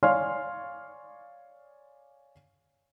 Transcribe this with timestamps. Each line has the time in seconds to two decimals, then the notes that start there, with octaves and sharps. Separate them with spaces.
0.03 C#5 D5 F5 G#5 C6 F6